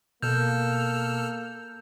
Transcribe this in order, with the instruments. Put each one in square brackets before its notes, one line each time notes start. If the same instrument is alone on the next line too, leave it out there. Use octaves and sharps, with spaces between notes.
[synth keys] B2 [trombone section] A#3 [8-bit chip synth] A4 E6 F6 [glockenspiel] G6